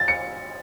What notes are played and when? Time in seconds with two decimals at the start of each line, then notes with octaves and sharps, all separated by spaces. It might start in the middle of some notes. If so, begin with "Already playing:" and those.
Already playing: A6
0.08 C#7